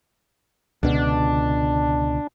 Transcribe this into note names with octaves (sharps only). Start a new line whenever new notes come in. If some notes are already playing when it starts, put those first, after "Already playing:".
C#2 B2 D3 D4